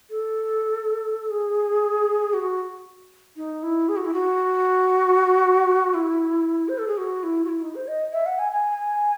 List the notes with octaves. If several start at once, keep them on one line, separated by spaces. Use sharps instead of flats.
A4
G#4
F#4
D#4
E4
G#4
F#4
E4
F#4
E4
C5
A4
G#4
F#4
E4
F#4
E4
D#4
C5
D#5
E5
F#5
G#5
G#5